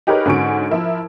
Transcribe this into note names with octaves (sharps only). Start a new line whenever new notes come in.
D#4 G4 G#4 A#4 B4 C#5
G#2 D3 C#4 F#4 C#6 D7
F3 E4 A#4